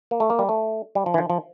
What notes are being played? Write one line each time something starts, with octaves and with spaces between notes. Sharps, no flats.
A#3
A3
A#3
G3
A3
G3
F3
E3
F3
F3